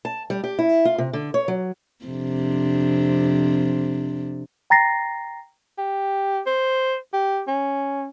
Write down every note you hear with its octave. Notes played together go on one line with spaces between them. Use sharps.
A5
G3
G4
E4
F4
C3
D3
C#5
F#3
F2 C3 D4
G5 A#5 A6 A#6 C7
G4
C5
G4
C#4